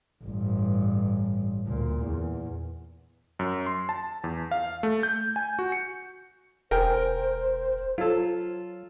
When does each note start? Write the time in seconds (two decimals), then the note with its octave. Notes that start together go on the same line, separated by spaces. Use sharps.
0.24 A1 G2
1.66 D2 A#2
2.04 E2
3.39 F#2
3.66 C6
3.89 A5
4.24 E2
4.51 F5
4.83 A3
5.03 G6
5.36 G#5
5.59 F#4
5.72 C#7
6.71 E1 A#4 C5 G5 G#5
7.98 F#3 F4 A4